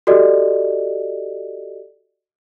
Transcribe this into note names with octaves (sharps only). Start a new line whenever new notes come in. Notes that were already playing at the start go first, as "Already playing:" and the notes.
F#4 G4 A4 D5 D#5